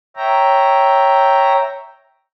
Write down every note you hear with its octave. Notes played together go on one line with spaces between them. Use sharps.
C#5 E5 G5 A#5